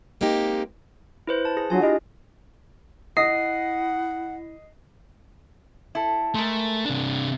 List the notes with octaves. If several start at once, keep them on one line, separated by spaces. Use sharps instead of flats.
G#3 A#3 C4 D#4 G4
E4 B4 C5
A5
G#4 A#6
F#3 D4 F4 G#5
E4 G4 D#5
E4 D#5 F#5 D#6 A#6 C7
E4 A4
G#3 A3 A#4
C3 D4